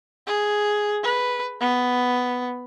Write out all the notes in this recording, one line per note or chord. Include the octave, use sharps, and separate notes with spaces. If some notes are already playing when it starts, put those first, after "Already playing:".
G#4
B4
B3